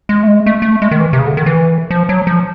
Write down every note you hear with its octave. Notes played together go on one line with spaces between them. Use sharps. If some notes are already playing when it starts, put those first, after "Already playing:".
G#3
A3
G#3
A3
A3
G#3
D#3
E3
C3
C#3
D3
D#3
E3
F3
F#3
F3